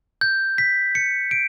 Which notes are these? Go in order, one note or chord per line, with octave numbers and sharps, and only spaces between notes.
G6
B6
C#7
D7